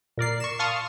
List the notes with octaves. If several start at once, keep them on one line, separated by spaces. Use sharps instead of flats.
A#2 A#4 D5 C7
C#6 E7
F5 A5 C6 C#6 D#6 F6